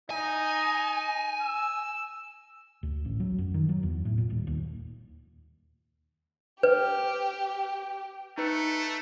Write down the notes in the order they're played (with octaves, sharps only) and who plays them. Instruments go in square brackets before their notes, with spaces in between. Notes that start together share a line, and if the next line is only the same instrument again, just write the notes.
[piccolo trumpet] D#4 [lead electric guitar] G#5
[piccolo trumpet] E6
[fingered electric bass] D2
A1
F#3
F#2
D#3
F#3
E2
A2
A#2
D#1
D#2
[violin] G4 [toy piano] B4
[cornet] A3 [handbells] D#4 B4 C#7